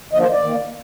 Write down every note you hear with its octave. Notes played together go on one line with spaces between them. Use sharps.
D3 F3 A#3 D#5
C5
D5
D#3 A#3